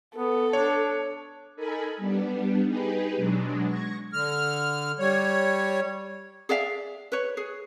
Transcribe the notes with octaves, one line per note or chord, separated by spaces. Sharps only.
B3 A4
D4 C#5
D#4 A4 A#4 G#5 B5
G3 B3 D4
D#4 G4 G#4 B4
B2 F#3 G#3 D4
C#6 G#6 A#6
D3 F6
G3 C#5
G#4 D5 E5 F5
B4 C#5
G#4